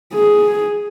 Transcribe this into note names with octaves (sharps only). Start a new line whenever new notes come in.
G#4